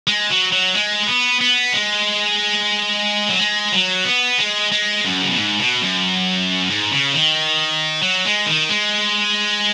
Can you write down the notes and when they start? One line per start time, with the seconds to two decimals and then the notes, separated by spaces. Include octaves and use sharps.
0.07 G#3
0.30 F#3
0.52 F#3
0.75 G#3
1.07 B3
1.41 B3
1.73 G#3
3.29 F#3
3.39 G#3
3.72 F#3
4.05 B3
4.38 G#3
4.72 G#3
5.05 F#2
5.22 C#3
5.30 B2
5.38 G#2
5.60 B2
5.82 F#2
6.70 G#2
6.92 C#3
7.14 D#3
8.02 F#3
8.25 G#3
8.46 D#3
8.69 G#3